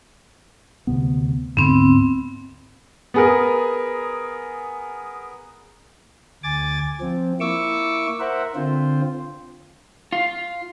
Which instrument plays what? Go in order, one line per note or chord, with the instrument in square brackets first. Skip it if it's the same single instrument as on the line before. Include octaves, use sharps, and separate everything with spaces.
[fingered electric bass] D2 C3 B3
[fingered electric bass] D2 G#2 D3 [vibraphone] B3 C4
[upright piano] B3 G#4 A#4
[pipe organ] D2 G#5 D6 A6
F3 C4
A#3 E4 C#6 D6 E6
A#4 C5 E5 F#5
D3 C4 F4 C5
[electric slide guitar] F4